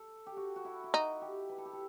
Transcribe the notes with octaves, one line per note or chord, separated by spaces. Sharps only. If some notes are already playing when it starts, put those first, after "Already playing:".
Already playing: A4
G4
F#4
F#4
E4
E4
D#4 F#4
G4
B4
A4
G4
A4